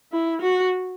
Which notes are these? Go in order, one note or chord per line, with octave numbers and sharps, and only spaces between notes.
E4
F#4